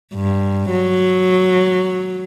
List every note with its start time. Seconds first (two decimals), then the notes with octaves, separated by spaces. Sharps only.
0.15 G2
0.70 F#3